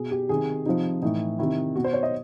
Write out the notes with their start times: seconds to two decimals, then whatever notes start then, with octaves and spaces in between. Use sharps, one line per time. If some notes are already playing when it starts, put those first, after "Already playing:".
Already playing: B2 G#4
0.11 G4
0.29 C3 D#3 G#4
0.66 C3 F3 D#4
1.02 A2 E3 D#4
1.39 C3 D#3 E4
1.76 B2 F#4
1.84 C5
1.94 C#5
2.03 D#5